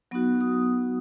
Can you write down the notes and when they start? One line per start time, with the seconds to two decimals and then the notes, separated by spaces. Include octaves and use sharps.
0.11 F#3 B3 D#4 F#4
0.41 D#6